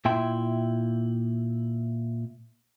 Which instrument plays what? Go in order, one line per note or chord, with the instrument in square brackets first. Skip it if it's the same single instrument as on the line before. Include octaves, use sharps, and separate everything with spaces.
[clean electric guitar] A#2 E4 E5 G5 C6